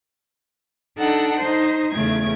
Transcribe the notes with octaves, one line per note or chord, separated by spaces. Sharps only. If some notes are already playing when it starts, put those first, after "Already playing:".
D4 D#4 A4 F#5
D#4 C5
E2 C#3 A3 G#6